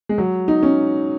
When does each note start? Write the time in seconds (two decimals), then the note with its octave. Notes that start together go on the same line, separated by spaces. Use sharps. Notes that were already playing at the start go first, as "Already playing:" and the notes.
0.09 G#3
0.18 F#3
0.48 D#4
0.63 C#4